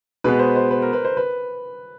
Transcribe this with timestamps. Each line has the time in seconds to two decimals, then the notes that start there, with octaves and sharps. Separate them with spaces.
0.24 B2 G#3 B3 B4
0.39 C5
0.56 C5
0.71 B4
0.82 A#4
0.93 B4
1.05 C5
1.17 B4